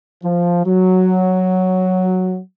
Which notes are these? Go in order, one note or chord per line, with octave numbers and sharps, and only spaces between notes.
F3
F#3